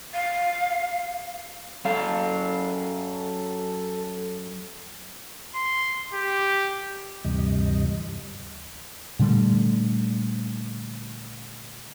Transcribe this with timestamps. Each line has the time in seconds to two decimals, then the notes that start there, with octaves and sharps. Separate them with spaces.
0.14 F5
1.85 F#2 A4 F5
5.55 C6
6.14 G4
7.24 D2 G2 C3 E3 G3 D#5
9.19 A#2 D3 G3 A3